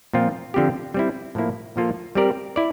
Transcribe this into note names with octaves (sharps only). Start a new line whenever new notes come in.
A#2 F3 C4 F4
D3 F3 C4 G4
G3 C4 E4
A2 F3 A#3 E4
A#2 F3 A#3 F4 A4
G3 C4 G4 A#4 D5
E4 D5